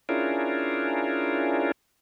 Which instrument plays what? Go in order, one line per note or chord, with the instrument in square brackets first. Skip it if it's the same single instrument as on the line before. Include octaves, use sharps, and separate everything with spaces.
[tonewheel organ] C#4 D4 E4 F4 G#4 A#4